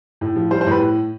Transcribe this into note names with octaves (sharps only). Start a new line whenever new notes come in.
A2
F3
G3 C5
C5
A2 B4